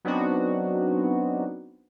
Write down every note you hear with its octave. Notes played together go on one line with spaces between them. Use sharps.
F#3 B3 C4 D4 D#4 F#4